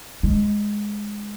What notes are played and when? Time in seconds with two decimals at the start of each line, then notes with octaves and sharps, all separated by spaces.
0.23 G#3